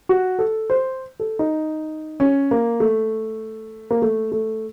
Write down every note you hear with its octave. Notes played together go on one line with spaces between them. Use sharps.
F#4
A4
C5
A4
D#4
C#4
A#3
A3
A#3
A3
A3